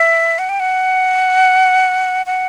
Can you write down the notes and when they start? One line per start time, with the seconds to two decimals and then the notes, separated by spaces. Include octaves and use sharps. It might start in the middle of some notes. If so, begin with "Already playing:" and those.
Already playing: E5
0.38 F#5
0.49 G5
0.60 F#5
2.26 F#5